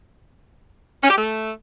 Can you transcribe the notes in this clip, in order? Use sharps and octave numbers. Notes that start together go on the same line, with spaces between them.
C#4
G4
A3